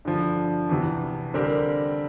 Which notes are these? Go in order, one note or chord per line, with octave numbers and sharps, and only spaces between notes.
G2 D3 F3
E2 C3 E3
D3 G3 C4 G4 A#4